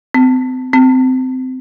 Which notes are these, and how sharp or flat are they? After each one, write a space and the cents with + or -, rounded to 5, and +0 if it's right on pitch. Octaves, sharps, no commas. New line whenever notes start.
C4 -35
C4 -20